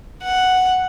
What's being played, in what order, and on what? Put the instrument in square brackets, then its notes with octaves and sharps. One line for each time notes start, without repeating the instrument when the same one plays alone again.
[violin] F#5